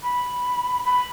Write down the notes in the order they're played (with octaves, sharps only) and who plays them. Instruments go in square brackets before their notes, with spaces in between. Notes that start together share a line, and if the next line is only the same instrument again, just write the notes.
[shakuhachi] B5
B5